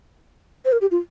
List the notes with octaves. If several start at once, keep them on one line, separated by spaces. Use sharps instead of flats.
C5
A#4
G4
F4